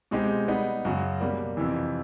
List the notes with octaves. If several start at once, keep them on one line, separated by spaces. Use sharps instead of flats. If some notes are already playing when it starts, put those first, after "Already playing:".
B2 G#3 C4 D#4 G4
G3 B3 D#4
F#2 C#3 F#3
B2 G3 A#3
F2 C3 E3